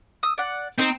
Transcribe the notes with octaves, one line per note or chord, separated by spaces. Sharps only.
D#6 E6
D5 F#5
C4 D#4 C5 A#5